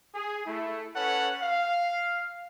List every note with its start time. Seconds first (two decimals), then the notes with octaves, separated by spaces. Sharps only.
0.15 G#4
0.46 A3 E4
0.95 C#4 A4 B4 C#5 F#5
1.40 F5